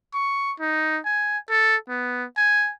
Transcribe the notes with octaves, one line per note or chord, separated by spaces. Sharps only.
C#6
D#4
G#5
A4
B3
G#5